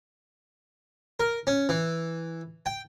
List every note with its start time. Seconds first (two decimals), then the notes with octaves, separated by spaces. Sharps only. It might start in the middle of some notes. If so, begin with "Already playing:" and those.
1.20 A#4
1.47 C#4
1.69 E3
2.66 G5